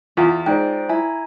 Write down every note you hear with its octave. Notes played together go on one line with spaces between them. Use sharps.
E2 F4
G#2 C5 D5 G5
E4 G#5 A#5